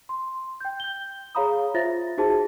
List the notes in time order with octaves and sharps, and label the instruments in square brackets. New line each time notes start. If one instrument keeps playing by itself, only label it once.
[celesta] C6
G5 G6
G6 G7
G#4 C#5 F5 A#5 B5 D#6
F4 C5 E5 A6 A#6
D#4 F#4 G#4 C5 A5